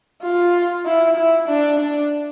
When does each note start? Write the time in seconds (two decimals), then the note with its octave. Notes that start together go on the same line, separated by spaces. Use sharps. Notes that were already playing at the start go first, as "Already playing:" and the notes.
0.23 F4
0.86 E4
1.17 E4
1.49 D4
1.80 D4